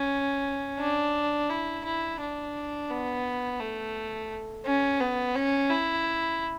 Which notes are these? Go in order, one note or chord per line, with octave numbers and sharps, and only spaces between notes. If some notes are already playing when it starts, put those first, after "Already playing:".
Already playing: C#4
D4
E4
E4
D4
B3
A3
C#4
B3
C#4
E4